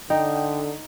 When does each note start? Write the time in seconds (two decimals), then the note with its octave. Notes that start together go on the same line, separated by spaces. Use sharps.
0.10 D3 D#4 G5